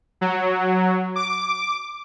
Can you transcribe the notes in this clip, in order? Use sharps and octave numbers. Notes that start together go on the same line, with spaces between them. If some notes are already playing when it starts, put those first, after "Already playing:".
F#3
D6